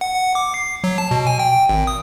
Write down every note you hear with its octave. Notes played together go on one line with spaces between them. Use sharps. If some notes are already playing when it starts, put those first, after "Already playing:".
F#5
F#5
D6
C7
F#3
A5
B2
G#5
G5
G5
G#1
D#6